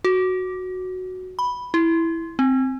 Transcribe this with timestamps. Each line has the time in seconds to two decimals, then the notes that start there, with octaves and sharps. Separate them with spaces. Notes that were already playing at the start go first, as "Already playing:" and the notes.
0.05 F#4
1.39 B5
1.74 E4
2.39 C4